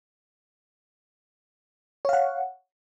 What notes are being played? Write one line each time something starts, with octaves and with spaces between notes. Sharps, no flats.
C#5 F5 F#5